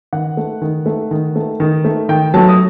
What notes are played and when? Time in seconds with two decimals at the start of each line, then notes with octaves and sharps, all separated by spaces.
0.13 D#3 F#5
0.37 A3
0.62 D#3
0.86 A3
1.11 D#3
1.36 A3
1.60 D#3
1.85 A3
2.09 D#3 G5
2.34 F#3 A3 A5
2.49 D#6